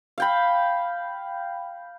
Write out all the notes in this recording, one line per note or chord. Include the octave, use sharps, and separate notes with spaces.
F5 G5 B5